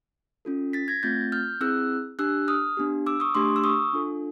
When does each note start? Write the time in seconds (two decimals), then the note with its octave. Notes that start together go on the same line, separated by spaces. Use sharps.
0.45 C#4 F4 A4
0.73 A6 B6
0.88 G#6 A#6
1.03 A3 C4 F4 G6 A6
1.32 F6 G6
1.61 C4 E4 G#4 E6 F#6
2.19 D4 G4 E6 F#6
2.48 D#6 F6
2.77 B3 D4 G4
3.06 D6 E6
3.20 C#6 D#6
3.35 A3 D4 G4 C6 D6
3.56 E6
3.64 C#6 D#6
3.93 D4 F4 A4